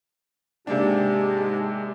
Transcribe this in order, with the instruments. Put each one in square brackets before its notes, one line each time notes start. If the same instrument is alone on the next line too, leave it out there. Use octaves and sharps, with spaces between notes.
[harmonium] G#2 G4 A5 [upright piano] C3 A#3 D4 [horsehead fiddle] G#3